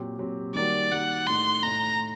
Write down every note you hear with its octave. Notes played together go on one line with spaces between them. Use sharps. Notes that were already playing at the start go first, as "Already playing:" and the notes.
Already playing: A#2 F#3 C4 G4
A#2 F#3 C4 G4
D#3 G3 A#3 F#4 D5
D#3 G3 A#3 F#4 F#5
A2 A3 D#4 C6
A2 A3 D#4 A#5